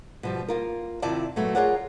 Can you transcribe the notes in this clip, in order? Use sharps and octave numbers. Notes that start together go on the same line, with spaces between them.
B2 F3 G3
A#3 F4 A#4
C3 D#3 E4 F4 D5 A5
A#2 F#3 A3 B3
F4 G#4 A#4 C#5 D5 F#5